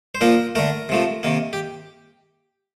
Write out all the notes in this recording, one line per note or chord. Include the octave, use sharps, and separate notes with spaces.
C5
A#2 F3 A#3 A#4
D3 A3 A#4
C3 F3 A3
C3 D#3 A#3
G4